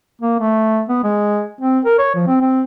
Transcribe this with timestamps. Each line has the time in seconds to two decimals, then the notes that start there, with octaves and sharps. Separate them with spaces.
0.22 A#3
0.40 A3
0.89 B3
1.04 G#3
1.61 C4
1.85 A#4
1.99 C#5
2.15 F3
2.27 C4
2.41 C4